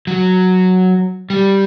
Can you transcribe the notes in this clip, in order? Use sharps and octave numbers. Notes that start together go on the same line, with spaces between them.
F#3
G3